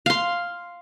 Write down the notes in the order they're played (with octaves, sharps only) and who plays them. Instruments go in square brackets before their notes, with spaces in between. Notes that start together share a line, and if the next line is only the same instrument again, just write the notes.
[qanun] F5 C6